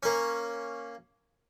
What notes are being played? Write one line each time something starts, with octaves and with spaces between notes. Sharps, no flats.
A#3 C#4